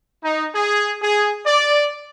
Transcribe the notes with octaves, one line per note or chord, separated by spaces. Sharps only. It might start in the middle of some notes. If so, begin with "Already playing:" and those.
D#4
G#4
G#4
D5